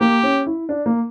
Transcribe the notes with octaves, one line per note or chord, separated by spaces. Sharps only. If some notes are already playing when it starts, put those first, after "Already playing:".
A#3 G4
C#4
E4
D4
A#3